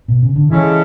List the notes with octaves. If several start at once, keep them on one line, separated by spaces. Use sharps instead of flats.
B2
C#3
D3
C#3 E3 G#3 C#4 E4 A4